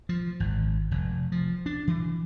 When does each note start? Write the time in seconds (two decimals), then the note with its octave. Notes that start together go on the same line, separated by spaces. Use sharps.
0.09 F3
0.40 G#1
0.91 F1
1.32 F3
1.66 D4
1.88 E3